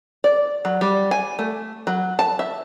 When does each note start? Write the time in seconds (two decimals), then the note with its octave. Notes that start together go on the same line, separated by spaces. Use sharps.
0.24 D5
0.65 F#3
0.81 G3
1.11 G#5
1.39 A3
1.87 F#3
2.19 A5
2.39 E5